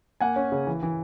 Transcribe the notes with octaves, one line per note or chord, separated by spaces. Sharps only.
A#3 F#5 G#5
C#4
C#3
E3
E3